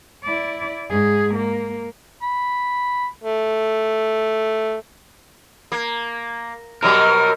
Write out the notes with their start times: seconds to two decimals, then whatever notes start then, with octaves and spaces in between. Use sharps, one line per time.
0.24 E4 D5
0.90 G#2 G#4
1.35 A#3
2.23 B5
3.23 A3
5.72 A#3
6.83 B2 F#3 G3 A#4 F6